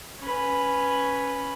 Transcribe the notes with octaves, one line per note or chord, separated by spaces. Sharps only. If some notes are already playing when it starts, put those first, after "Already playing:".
C#4 B4